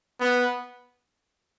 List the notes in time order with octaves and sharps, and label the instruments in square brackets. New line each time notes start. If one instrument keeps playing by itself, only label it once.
[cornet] B3